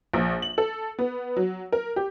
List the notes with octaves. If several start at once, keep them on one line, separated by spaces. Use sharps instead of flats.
A#1
F#7
A4
B3
F#3
A#4
G4